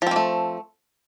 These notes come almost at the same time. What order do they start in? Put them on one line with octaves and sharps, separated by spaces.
F3 C4 A#3 A3